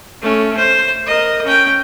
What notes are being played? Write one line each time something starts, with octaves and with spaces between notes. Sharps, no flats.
A3 C#4
C5
A#4 D#5
C#4 G5